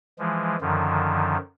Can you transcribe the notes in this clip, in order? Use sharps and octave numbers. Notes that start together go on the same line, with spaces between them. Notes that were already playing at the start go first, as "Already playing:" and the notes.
E3 F3 G#3
F#2 D3 D#3 F3